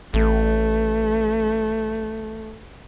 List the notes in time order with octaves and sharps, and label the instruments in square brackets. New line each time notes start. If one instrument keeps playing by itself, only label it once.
[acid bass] A1 [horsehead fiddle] A3